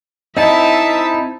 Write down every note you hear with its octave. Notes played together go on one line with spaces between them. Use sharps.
C4 D#4 E4 D#5 E5 A5